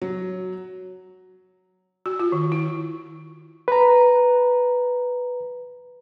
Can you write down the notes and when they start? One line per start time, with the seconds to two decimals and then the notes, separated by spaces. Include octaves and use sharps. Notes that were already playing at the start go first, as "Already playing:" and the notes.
0.02 F#3
2.06 F#4
2.19 F4
2.32 D#3
2.52 E4
3.68 B4 A#5